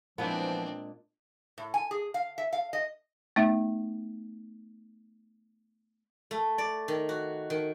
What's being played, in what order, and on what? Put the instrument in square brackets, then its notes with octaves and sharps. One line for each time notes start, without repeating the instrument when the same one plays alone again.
[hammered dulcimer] A#2 G#3 [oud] E3 B3 [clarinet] F3 [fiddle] C4 D4
[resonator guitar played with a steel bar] A2
G#5
G#4
F5
E5
F5
D#5
[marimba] A3 B3 D#4 E5
[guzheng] A3
D5
D#3
F#4
D#3